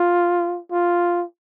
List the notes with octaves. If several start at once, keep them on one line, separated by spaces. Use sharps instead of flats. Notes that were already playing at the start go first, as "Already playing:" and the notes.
Already playing: F4
F4